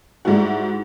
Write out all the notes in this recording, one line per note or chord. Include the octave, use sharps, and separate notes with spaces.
G#2 G3 E4 F#4